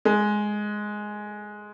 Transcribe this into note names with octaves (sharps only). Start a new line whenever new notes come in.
G#3